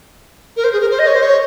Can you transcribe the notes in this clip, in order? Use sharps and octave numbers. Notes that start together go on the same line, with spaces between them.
A#4
C5
G#4
A#4
C5
D#5
C#5
C5
C#5